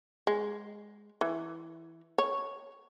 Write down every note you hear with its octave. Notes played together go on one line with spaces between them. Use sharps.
G#3
E3
C#5